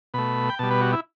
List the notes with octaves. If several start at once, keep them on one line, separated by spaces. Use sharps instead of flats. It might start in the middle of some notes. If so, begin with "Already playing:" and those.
B2 A3 B5
G5
B2 G3 A5
B4
F#4
E4